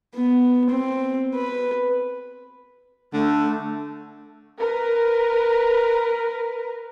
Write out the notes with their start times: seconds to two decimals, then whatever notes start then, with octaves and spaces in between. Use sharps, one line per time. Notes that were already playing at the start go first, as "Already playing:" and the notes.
0.15 B3
0.70 C4
1.35 B4
3.13 D3 A3
4.60 A#4 B4